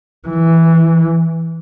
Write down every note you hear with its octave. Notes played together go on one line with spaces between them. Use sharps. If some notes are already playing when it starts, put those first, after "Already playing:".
E3